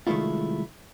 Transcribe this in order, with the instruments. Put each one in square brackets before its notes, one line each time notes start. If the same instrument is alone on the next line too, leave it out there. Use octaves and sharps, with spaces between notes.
[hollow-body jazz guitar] C2 D#3 G#3 A3 E4 F4